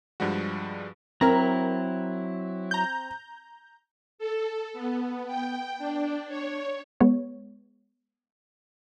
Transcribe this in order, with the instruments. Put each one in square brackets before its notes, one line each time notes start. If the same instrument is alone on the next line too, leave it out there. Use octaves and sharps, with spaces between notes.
[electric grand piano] G2 F3 G3 G#3 F#4
[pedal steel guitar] F#3 E4 [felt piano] C4 [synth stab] A#4 A#5
[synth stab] A#5 G6
[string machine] A4
B3
G5
D4
C#5
[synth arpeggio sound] G#3 B3 C#5